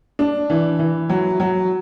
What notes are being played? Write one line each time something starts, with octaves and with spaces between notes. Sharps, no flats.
D4
E3
E3
F#3
F#3